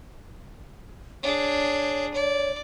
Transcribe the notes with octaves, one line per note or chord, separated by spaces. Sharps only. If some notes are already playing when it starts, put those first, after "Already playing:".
D4 G#4 C#5
C#5 D5